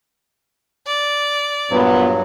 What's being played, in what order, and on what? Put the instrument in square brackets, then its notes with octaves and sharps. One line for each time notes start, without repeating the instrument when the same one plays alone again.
[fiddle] D5
[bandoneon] G2 F#3 [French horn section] A#2 B3